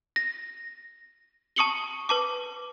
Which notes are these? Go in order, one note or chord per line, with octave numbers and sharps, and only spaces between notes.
A#6
A5 C#6 D#6 C#7 F#7 G7
B4 A5 D6